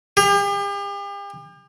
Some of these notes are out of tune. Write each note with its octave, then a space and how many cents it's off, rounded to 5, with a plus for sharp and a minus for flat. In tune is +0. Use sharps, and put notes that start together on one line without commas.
G4 +40